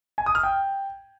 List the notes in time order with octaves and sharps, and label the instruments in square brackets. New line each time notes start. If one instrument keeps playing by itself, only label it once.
[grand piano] G#5
D#6
F6
G5